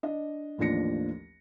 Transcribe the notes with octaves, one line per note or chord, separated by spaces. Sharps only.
D4 D#5
A1 D#2 F3 D4 A#6 C#7